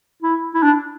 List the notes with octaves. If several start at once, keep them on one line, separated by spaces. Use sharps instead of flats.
E4
E4
D4